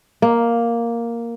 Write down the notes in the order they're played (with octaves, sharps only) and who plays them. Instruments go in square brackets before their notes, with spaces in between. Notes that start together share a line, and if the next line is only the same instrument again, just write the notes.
[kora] A#3